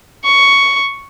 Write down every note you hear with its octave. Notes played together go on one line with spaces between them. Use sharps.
C#6